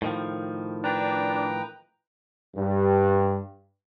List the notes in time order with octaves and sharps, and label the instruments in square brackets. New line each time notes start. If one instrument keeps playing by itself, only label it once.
[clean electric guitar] A2 D#3 F3
[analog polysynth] D4 [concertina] B4 G5 A#5
[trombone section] G2